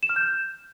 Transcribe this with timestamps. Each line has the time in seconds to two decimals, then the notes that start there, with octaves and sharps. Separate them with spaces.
0.03 E7
0.09 F6
0.16 G6